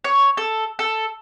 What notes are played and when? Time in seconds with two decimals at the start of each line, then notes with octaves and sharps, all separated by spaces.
0.04 C#5
0.37 A4
0.79 A4